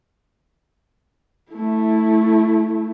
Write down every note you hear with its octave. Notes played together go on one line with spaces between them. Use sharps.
A3 E4